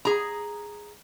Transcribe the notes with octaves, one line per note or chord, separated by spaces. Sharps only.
G#4 A#5